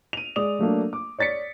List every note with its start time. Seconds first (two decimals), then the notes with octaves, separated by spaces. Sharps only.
0.13 D#7 F7
0.36 G#3 D5 D#6 F7
0.59 F#3 A3 A#3 D4
0.93 D6
1.19 C#5 D5 A6 B6 C#7